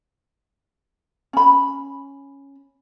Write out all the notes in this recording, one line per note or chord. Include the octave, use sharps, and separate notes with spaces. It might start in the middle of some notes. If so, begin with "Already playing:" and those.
C#4 B5